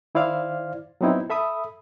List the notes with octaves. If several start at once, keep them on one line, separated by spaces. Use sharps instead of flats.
D#3 E4 C5 D5 F5 F6
F#3 B3 C4 D#4 E4
A4 E5 B5 D#6